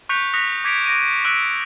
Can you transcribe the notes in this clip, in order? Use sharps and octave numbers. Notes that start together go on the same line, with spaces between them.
C#6 F#6 G6 B6 C#7 F7
D#6 F#6 A#6 B6 C#7 F7
D6 G#6 B6 C#7 D7 F7
D6 A#6 D7 D#7
C#6 E6 F#6 B6 D7